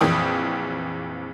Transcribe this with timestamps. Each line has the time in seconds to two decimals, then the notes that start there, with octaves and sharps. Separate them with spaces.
0.01 A#1 F2 E3 G5 D#6